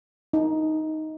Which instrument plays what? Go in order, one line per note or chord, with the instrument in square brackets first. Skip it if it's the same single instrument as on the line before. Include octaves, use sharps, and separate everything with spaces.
[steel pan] D#4